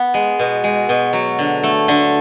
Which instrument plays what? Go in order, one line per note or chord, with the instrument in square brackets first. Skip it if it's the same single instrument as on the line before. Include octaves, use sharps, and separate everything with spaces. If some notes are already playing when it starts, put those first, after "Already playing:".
Already playing: [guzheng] B3
G#3
B2
G#3
B2
F#3
D3
A3
D3